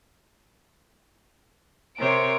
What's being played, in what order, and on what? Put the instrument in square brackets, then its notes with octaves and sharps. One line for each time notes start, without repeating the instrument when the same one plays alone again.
[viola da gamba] C3 C5 C#5 [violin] A#4 D7